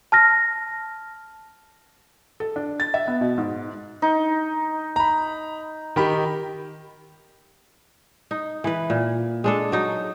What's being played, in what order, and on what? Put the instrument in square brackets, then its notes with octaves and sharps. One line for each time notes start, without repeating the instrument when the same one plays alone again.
[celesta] A5 F6 A#6
[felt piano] A4
D4
A6
E5
B3
B2
G#2
[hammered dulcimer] D#4
[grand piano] A#5 B5
D#3 G4 B5
[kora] D#4
E3 B4
A#2
G#3 D4 A4
F#3 D#4